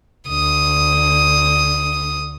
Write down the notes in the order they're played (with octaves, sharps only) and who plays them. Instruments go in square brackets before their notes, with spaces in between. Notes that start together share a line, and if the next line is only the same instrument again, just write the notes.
[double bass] D2 [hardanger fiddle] D#6